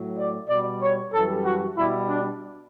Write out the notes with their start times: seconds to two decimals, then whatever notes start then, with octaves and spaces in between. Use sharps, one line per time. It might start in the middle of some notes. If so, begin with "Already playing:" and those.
Already playing: A2 F#3
0.18 D5
0.49 B2 G3 D5
0.81 C#5
1.13 F#2 E3 G3 A4
1.45 F#4
1.76 B2 G3 E4
2.08 D4